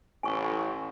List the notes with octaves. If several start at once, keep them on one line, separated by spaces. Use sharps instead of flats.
A1 G#5 C#6